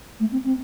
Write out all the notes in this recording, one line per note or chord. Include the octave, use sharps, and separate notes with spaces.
A3
C4
C4